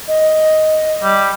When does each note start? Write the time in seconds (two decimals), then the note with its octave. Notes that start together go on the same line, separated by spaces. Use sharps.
0.08 D#5
1.03 G3